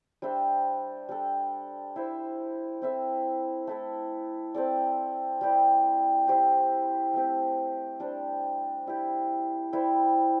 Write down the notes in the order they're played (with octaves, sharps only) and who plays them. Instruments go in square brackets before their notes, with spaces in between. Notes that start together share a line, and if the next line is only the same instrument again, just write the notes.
[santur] G3 D4 C5 E5
G3 D4 A4
E4 C5 E5
C4 E4 A4 E5
A3 E4 A4
C4 A4 D5
G3 E4 G4 D5
E4 G4 C5
A3 C4 G4
G3 D4 C5
G3 E4 G4
G3 E4 C5 E5